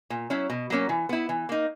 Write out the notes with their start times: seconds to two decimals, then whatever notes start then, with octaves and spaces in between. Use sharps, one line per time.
0.10 A#2
0.30 F#3 C#4 E4
0.50 B2
0.70 F#3 A#3 C#4
0.89 E3
1.09 B3 E4
1.29 E3
1.49 A#3 D#4